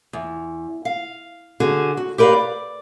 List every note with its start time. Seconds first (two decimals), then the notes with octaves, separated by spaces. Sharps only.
0.13 E2
0.85 F5
1.60 D3 F#4 G#4
1.97 F#4
2.18 G4 A#4 B4 C#5 D5 F5
2.33 D5